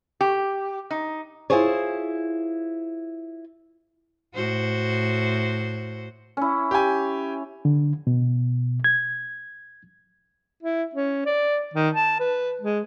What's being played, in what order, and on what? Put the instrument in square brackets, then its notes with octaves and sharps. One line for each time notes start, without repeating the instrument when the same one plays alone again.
[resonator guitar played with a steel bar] G4
D#4
[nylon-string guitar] E4 F4 G#4 C5 C#5
[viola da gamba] A2 F#4 C5
[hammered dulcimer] C#4 E4
[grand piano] G4 G#5
[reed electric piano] D3
B2
G#6
[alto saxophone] E4
C#4
D5
D#3
A5
B4
G#3